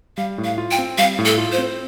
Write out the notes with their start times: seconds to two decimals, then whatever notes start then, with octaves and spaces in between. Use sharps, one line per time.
0.17 G3 F5
0.38 A2
0.44 F5
0.58 F4
0.71 G5
0.78 C4
0.98 G3 F5
1.19 A2
1.25 A4
1.38 F4
1.52 C5
1.58 C4